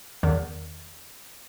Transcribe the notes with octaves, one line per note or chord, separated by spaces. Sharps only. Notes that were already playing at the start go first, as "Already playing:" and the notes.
E2 D#3